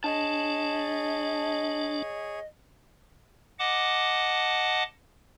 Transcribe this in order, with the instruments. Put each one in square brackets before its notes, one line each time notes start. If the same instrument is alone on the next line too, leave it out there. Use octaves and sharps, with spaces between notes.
[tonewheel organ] D4 [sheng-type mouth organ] G#4 C#5 [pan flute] D#5 [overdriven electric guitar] A5
[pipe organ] D#5 F#5 A5 D6